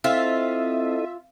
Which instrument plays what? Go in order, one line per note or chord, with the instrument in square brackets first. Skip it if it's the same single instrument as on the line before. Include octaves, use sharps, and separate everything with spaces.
[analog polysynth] C4 [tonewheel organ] E4 A4 D#5 [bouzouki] F4 [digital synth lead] E5